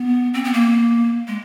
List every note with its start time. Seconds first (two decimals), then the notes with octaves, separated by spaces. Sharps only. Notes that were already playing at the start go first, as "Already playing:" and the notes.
Already playing: B3
0.34 C4
0.44 B3
0.53 A#3
1.28 G#3